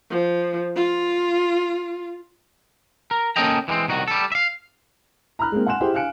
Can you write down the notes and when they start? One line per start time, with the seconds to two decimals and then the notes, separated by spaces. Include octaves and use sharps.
0.10 F3
0.75 F4
3.11 A#4
3.36 A#3 C#4 A4 D#5 G5 A#5
3.68 E3 G3 G#3 C4
3.88 C2 D#3 F#4
4.08 G3 A4
4.32 E5 F5
5.39 A#5 B5 F6 F#6
5.52 G#3 A#3 C4
5.67 F#5 G#5 C6 F#6 E7
5.81 E4 G4 G#4 C5 G5 C6
5.94 F5 G#5 F#6 C#7 D7